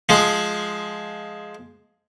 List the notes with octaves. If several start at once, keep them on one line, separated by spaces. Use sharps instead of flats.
F3 G#3